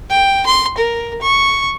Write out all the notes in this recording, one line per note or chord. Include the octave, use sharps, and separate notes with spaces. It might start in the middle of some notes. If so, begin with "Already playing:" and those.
G5
C6
A#4
C#6